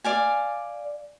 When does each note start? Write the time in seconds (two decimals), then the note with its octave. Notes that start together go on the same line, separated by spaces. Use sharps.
0.04 D5 F5 G#5